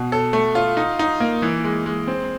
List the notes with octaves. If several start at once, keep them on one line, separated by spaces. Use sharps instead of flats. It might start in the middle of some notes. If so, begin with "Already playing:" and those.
Already playing: B2
A4
A3
F4
D#4
D#4
A#3
E3
G#3
G#3
C4